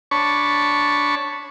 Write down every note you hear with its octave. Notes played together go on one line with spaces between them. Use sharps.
D4 C#5 A5 B5 C#6